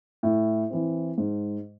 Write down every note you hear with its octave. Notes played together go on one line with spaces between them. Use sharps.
A2
E3 C4
G#2